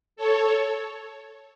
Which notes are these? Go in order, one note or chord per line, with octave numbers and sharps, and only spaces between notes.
A4 C#5